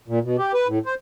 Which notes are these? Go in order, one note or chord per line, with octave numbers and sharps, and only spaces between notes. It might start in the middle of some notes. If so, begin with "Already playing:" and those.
A#2
B2
G4
B4
A2
C5